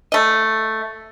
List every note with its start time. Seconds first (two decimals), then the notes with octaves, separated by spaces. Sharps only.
0.12 A3 D#5